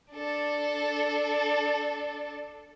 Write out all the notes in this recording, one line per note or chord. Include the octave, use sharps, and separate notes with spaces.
D4 A4